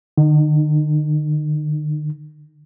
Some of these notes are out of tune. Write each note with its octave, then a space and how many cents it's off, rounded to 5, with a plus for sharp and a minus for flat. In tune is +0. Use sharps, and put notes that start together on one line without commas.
D3 +45 D#4 -20